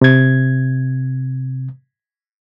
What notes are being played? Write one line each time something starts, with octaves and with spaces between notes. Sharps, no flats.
C3 G#6